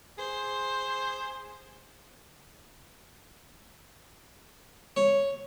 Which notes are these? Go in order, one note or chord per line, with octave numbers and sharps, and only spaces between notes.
G#4 C5
C#5